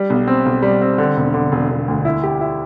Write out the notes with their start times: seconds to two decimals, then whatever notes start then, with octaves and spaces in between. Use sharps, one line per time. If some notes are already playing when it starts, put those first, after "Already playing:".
Already playing: G3
0.10 B1
0.28 C4
0.46 B1
0.62 G3
0.81 C4
0.98 D3
1.17 E1
1.34 D3
1.52 E1
1.70 E1
1.88 D2
2.05 E4
2.23 G4
2.41 E4